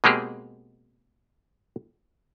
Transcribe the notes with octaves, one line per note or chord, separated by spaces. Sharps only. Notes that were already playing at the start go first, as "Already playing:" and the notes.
B2 G#3 A#3 C4 G4 G#4